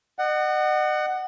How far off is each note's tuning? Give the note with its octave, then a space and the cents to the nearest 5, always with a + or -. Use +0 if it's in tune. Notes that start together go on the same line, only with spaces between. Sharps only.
D#5 -40 F#5 +15